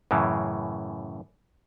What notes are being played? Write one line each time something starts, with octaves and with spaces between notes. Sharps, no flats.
F#2 A2 C#3 E3